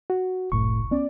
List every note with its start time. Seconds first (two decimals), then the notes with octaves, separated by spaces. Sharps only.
0.10 F#4
0.52 F#1 C2 A2 C#6
0.91 B3 C#4 D5